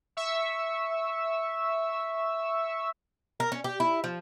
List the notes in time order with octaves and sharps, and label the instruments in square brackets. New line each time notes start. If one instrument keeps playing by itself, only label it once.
[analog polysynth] E5 C#6 E6
[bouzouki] A#4
C#4
G4
E4
F3